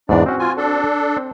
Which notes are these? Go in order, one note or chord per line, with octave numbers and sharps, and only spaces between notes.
E2 G#2 D4 D5
C4 C#4 F#4
F4 G#5
D4 A4
C4